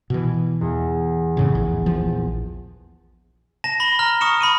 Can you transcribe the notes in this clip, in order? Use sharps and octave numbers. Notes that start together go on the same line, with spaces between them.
B2 E3
E2
F2 A2 C#3
A#1
A#1 F3
A5 A#6 E7
B5 A#6 G7
A#5 F6
C#6 D#6 C#7 E7
B5 C#6 D#7